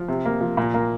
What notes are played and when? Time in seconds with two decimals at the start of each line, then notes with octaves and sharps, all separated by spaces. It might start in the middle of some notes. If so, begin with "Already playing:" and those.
Already playing: F3
0.08 C3
0.25 A#3
0.41 F3
0.57 A#2
0.74 A#3